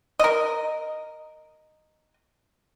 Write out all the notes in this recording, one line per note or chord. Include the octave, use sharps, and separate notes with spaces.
A#4 D#5